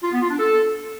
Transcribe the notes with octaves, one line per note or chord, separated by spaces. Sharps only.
F4
B3
F4
D4
A4